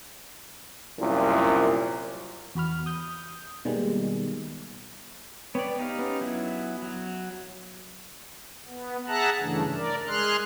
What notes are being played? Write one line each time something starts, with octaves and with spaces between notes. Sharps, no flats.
C2 F#2 A#2
E2 F#4 B5 F6
D#6 G6
B2 D#3 G3 G#3 A#3
B3 C#5 D5 G5
D#4 G4 F5
B3 C#4
F#3 E4
F#3
B3
G#4 E5 F#5 A5 A#5 F#6
G2 C#3 E3 A3 D4
A#4 D5
G#3 G#4 C6 F6 F#6